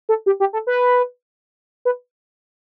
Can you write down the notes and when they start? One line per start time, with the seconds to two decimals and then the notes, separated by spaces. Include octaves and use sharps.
0.09 A4
0.26 G4
0.40 G4
0.53 A4
0.67 B4
1.85 B4